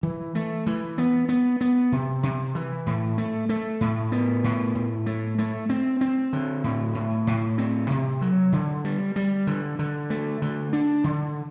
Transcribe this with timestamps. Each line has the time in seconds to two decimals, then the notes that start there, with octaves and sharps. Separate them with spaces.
0.03 E3
0.35 A3
0.66 E3
0.98 B3
1.29 B3
1.61 B3
1.92 C3
2.23 C3
2.55 E3
2.86 A2
3.18 A3
3.49 A3
3.81 A2
4.12 B3
4.44 A2
4.75 A2
5.06 A3
5.39 A3
5.70 C4
6.01 C4
6.33 D3
6.64 A2
6.95 A2
7.27 A2
7.58 C4
7.90 C3
8.21 F#3
8.52 D3
8.85 G3
9.16 G3
9.47 D3
9.79 D3
10.10 A3
10.42 D3
10.73 D4
11.04 D3